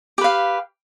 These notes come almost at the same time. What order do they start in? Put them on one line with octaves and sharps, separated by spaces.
G4 B4 F5